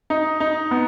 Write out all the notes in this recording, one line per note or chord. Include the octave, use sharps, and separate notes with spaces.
D#4
D#4
B3